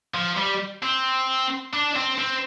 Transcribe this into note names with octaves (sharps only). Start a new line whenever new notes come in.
F3
G3
C4
D4
C4
C4